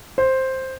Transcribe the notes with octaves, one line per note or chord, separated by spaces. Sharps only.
C5